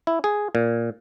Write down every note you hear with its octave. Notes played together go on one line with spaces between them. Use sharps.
E4
G#4
A#2